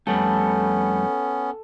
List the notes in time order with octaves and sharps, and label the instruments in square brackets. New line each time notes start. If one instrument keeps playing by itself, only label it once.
[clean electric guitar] F2 G3 A3 [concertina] B3 C#4 [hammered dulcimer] A4